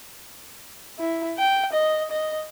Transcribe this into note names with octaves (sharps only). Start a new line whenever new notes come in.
E4
G5
D#5
D#5